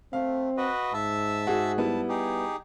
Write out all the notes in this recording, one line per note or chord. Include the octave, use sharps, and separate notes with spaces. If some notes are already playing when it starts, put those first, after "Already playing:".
A3 C4 F5
F#4 B4 D#5
G#2 E5 A5 E6
F#4 G#4
G3 B3 E4 A5
D#4 G4 G#4